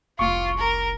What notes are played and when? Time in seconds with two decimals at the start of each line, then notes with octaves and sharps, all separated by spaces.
0.19 F1 C2 F4 C#6 D6
0.58 A#4